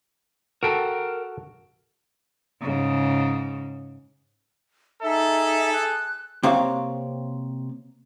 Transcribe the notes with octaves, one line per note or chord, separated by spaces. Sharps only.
F#4 A4 A#4 G5 A5
G#2 C#3
D#4 G#4 A4 E5
F#6
C3 A#3 C4 C#5 F5